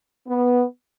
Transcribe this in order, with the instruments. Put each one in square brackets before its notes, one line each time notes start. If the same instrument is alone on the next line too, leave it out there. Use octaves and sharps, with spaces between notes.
[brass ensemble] B3